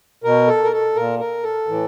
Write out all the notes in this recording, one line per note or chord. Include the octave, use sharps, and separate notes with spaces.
B2 A#4
A4
A#4
A4
A#2 A#4
A#4
A4
A2 E3